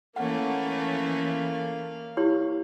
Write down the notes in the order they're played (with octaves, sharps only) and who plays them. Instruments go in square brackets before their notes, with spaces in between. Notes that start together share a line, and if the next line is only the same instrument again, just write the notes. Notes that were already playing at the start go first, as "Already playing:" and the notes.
[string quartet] E3 A3 C#4 [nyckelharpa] A#3 F5 [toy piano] F#5
[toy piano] E4 G4 C#5